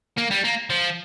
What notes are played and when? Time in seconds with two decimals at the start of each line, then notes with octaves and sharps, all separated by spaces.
0.18 A#3
0.31 G3
0.44 A#3
0.70 F3